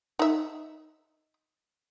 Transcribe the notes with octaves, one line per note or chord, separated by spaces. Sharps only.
D#4 E5